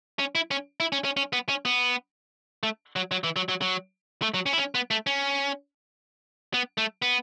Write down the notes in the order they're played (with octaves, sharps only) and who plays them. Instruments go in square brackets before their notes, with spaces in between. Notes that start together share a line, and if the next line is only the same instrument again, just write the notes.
[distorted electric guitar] C#4
E4
C#4
E4
C#4
C#4
C#4
B3
C#4
B3
A3
F#3
F#3
E3
F#3
F#3
F#3
A3
F#3
C#4
E4
C#4
B3
A3
C#4
B3
A3
B3